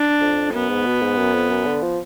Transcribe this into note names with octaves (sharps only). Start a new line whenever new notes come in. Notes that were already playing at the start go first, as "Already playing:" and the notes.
Already playing: D4
F2
F#2 B3
G#2
B2
G#2
F#2
F2
F#2
D3
F3